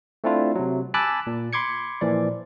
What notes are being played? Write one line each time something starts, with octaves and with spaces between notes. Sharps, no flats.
A3 C4 D4 E4 F4
C3 F#3
G#5 A5 B5 D6 E6 F#6
A#2
B5 C6 D6 G#6 C#7
A#2 E3 F3 D5